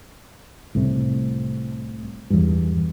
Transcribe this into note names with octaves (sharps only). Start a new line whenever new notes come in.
C2 A2 C3
E2 G2